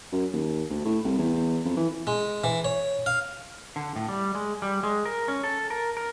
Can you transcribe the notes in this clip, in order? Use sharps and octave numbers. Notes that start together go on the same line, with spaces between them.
F#2
D#2
D2
A2
C2
E2
F2
E3
G#3
E3
C#5
F5
D3
A2
G3
G#3
G3
G#3
A#4
C#4
A4
A#4
A#4